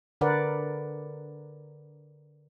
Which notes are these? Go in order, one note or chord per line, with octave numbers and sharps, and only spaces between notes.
D3 A#4 B4 D5 F#5